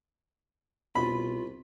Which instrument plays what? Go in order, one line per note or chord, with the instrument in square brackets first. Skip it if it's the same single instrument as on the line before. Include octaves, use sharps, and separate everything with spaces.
[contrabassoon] C2 [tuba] B2 [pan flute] F4 [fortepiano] B5